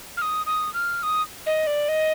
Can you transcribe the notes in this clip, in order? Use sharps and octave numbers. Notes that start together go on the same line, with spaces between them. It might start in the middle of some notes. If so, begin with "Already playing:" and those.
F6
D#6
D#6
F6
D#6
D#5
D5
D#5